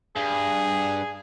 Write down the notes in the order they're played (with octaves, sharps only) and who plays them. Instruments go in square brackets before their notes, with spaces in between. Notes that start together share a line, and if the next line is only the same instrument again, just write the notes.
[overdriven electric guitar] G2 [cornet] G#4